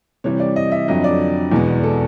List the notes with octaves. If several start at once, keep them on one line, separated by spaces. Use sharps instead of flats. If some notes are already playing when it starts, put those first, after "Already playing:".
C3 E3 G3 C#5
D5
D#5
E5
F2 D3 F#3 D#5
D5
E2 B2 G#3 B3
A4